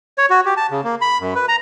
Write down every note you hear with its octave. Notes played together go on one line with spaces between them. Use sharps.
C#5
F#4
G4
A5
C#3
A#3
B5
F#2
B4
A#5